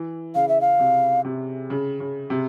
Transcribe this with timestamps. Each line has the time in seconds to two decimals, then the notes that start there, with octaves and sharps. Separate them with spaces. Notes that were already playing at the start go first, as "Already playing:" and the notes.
Already playing: E3
0.35 C#3 F5
0.49 E5
0.61 F5
0.79 C3
1.25 C3
1.70 C#3
2.00 C#3
2.30 C3